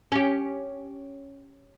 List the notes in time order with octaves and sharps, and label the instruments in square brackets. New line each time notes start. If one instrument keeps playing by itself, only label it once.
[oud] C#4 G4